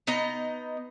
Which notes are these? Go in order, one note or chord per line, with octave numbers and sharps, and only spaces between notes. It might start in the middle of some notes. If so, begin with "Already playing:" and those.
B3 D#4 D#5